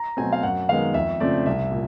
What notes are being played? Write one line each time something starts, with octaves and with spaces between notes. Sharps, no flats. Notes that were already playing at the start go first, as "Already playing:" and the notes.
Already playing: A#5
B2 F#3 A3 C4 G#5
F5
F#2 F#5
D#3 G#3 B3 F5
F2 E5
C#3 F3 A3 C4 D5
C2 E5
A#2